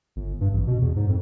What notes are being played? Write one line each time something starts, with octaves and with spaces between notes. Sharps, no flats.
G1
G2
A1
B2
E2
G#2
F2